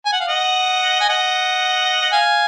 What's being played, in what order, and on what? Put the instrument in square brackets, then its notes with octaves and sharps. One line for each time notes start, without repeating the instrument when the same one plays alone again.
[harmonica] G#5
F#5
F5
D#5 F#5
G#5
D#5 F#5
F#5
F5 G#5